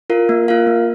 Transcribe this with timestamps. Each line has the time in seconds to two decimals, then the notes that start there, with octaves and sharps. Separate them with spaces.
0.10 F4 A#4 F5
0.29 A#3
0.48 F4 A#4 F5
0.67 A#3